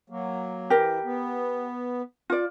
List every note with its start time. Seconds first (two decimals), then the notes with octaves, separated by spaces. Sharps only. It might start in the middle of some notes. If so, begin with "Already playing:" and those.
0.10 F#3 A#3
0.70 E3 G4 A#4
1.04 B3
2.30 F4 D5